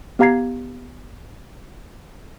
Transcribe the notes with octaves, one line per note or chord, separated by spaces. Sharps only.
B3 G4 F5 A#5 G#6 C7